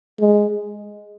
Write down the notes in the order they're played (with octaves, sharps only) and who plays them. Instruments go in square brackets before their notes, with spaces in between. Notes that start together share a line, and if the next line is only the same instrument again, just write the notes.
[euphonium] G#3